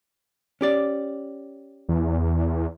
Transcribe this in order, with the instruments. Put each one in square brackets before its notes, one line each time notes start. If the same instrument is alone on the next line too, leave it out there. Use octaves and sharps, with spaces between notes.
[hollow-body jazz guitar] C#4 G4 D5
[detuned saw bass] E2